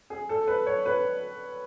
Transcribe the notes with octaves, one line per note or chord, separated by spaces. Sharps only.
G#4
A4
B4
C#5
B4